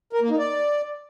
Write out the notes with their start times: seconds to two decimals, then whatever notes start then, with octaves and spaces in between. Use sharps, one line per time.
0.13 A#4
0.21 A#3
0.30 D#4
0.39 D5